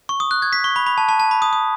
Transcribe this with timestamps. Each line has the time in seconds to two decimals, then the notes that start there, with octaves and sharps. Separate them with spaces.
0.09 C#6
0.20 D#6
0.31 F#6
0.42 G#6
0.53 B6
0.64 C#6
0.76 B5
0.86 B5
0.98 A5
1.09 A5
1.20 A5
1.31 B5
1.42 D#6
1.53 D#6